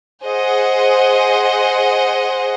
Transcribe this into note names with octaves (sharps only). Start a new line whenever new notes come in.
G#4 C5 D#5 F#5